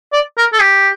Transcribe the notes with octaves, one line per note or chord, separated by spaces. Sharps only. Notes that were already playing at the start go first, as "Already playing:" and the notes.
D5
A#4
A4
G4